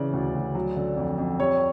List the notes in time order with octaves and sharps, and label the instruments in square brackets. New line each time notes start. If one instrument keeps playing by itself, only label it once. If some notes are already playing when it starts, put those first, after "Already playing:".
Already playing: [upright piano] C#3 E3 [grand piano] D5
[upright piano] D2
D2
F#3
D3
F2
F2
[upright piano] G3 [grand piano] C#5